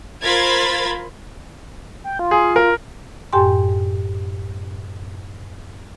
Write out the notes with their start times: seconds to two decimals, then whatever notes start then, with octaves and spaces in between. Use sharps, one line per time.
0.23 F4 A#4 C5 B5 G#6 A6
2.04 G5
2.19 F4
2.31 G#4
2.56 A#4
3.33 F#2 A2 G4 G5 G#5 C6